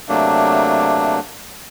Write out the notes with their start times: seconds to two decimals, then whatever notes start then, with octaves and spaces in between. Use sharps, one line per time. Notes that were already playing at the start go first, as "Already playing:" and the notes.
0.09 C3 F#3 A3 A#3 D4